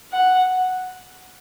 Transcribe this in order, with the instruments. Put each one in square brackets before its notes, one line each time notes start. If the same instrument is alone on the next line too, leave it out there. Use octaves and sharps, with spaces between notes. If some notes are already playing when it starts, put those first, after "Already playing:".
[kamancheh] F#5